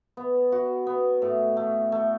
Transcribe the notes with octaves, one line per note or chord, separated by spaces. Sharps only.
B3
F#4
B3
A2
A3
A3